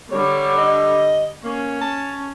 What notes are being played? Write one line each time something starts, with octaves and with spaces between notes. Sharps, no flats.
D3 G3 C#5
D#5
A#3 C#4
A5